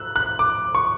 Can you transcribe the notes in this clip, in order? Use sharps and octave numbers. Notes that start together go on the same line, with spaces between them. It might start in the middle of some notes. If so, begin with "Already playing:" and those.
Already playing: E6 F#6
F#6
D6
C#6